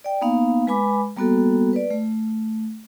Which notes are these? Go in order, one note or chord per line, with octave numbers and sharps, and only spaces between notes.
D5 G5
A#3 B3 D#4 F5
G#3 B4 G#5 B5 D6
G3 A#3 B3 F#4 A4
B4 D5
A3